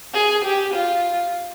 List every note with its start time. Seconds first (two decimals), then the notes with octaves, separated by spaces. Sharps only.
0.14 G#4
0.45 G4
0.74 F4